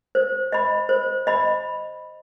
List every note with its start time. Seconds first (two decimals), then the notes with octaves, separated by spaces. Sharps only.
0.15 C5
0.52 D#5 B5
0.89 C5
1.27 D#5 B5